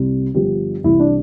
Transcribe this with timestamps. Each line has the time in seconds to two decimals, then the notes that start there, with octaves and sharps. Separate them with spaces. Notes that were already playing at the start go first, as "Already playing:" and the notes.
Already playing: C2 C3 G3
0.34 G1 G2 D3 F3 G4
0.84 C2 C3 E3 G3 E4
1.00 D4